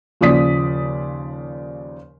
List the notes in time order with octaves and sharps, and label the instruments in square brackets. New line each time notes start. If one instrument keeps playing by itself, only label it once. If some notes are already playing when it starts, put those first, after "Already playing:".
[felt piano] D#2 C#3 F3 D5 D#6 B6